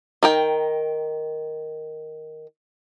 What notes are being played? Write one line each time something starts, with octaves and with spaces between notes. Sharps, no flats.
D#3 A#4 G5